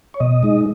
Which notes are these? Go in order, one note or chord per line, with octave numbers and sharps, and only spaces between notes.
C#5
B2 D#5
G#3 D#4